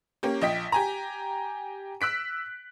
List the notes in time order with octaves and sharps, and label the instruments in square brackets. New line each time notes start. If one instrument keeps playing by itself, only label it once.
[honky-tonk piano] A#3 C#4 G4
A#1 D#5 G5 B6
G4 G#5 A#5
E6 F#6 B6 D7